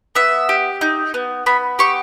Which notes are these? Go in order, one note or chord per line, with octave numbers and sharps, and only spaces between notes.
B3 E5
G4
D#4
B3
B3 B5
G4 C#6